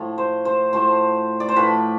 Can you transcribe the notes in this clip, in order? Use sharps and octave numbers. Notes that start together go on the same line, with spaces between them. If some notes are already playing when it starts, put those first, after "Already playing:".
Already playing: A2 F3 A3
C5
C5
A2 F3 A3 C5
D5
C5
A2 F3 A3 B4